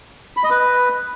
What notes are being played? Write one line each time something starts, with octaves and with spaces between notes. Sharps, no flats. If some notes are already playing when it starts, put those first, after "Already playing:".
B5
D#5
B4